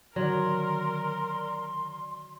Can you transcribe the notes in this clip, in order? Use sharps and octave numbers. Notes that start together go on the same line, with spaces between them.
D3 D#3 F#3 A#4 D5 C6